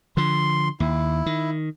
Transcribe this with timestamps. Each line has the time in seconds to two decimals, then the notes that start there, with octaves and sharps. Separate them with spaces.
0.17 D3 F3 C6
0.80 D#2 E4
1.26 D#3